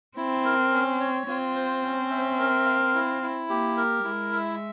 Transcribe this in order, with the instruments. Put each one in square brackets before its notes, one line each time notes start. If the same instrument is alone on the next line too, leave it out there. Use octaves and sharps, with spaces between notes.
[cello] C4 [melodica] E4
[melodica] A#4
C#4
C#5
[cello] C4 [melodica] F4
[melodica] C5
C#4
E5
A#4
F5
E4
E4
[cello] A#3 [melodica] G4
[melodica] A#4
[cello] G#3 [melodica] E4
[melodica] E5